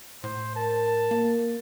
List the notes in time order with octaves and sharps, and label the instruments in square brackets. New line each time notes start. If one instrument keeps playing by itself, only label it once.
[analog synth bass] A2 [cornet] C5
[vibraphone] A#4 [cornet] A5
[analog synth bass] A#3